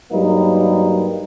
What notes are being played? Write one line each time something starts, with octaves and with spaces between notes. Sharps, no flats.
G2 F#3 G3 A#3 D#4 B4